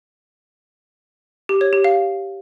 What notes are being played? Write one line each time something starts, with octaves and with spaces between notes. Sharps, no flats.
G4
C#5
G4
F5